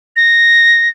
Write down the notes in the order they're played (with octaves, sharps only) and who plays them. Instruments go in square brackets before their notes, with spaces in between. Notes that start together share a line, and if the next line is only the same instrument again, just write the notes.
[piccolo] A#6